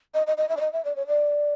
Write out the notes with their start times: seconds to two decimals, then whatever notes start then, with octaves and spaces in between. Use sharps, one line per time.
0.14 D#5
0.27 D#5
0.37 D#5
0.49 E5
0.57 D5
0.60 D#5
0.73 E5
0.85 D5
0.96 C#5
1.07 D5